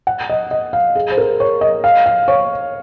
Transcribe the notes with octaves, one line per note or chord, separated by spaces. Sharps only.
F#5
D#5
D#5
F5
G#4
C5
A#4
C#5
D#5
F5
F5
C#5